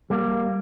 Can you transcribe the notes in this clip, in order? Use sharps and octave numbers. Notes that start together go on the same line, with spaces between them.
G3 A#3